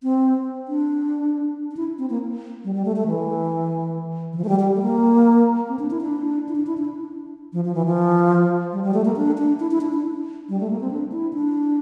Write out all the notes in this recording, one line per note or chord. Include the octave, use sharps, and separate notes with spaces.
C4
D4
D4
E4
C4
A#3
G3
G3
A3
A3
E3
E3
F3
A3
G3
G3
A3
A#3
C4
D4
E4
D4
E4
D4
E4
D4
F3
F3
E3
F3
G3
G3
A3
A#3
D4
D4
E4
E4
D4
D4
G3
A3
A#3
C4
D4
E4
D4